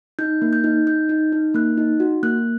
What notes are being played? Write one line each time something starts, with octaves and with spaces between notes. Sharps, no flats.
D#4 G6
A#3
G6
D#4
D#4 G6
D#4
D#4
A#3 F#6
D#4
F#4
A#3 F#6